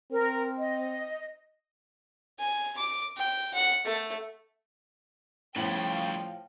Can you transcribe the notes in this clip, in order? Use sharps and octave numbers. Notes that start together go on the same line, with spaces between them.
C4 A#4
D#5
G#5
D6
G5
F#5
A3
A2 C#3 F3 G3 G5